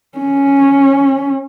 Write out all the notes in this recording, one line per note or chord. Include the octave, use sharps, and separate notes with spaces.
C#4